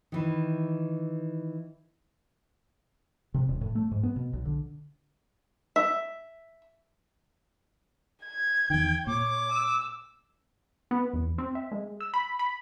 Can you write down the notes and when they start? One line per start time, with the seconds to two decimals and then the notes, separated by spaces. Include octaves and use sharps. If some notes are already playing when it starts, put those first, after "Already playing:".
0.12 D#3 E3
3.34 C3
3.49 D#1
3.61 A2
3.75 A3
3.91 G#2
4.03 B3
4.16 B2
4.33 B1
4.45 D3
5.76 E5
8.24 G#6
8.70 E2 D#3 G5
9.07 A#2 C#5 D6
9.52 E6
10.91 B3
11.14 E2
11.38 C4
11.55 E5
11.72 G#3
12.00 E6
12.14 B5
12.39 B5